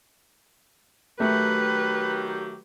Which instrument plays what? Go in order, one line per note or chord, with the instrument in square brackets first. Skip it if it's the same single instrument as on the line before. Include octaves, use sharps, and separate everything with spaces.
[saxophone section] D#3 F#3 G4 [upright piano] A3 [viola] B4